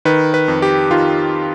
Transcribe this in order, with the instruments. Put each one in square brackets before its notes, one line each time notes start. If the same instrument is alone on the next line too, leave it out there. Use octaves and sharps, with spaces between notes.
[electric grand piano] D#3 B4
B4
F2
G4
D#3 F4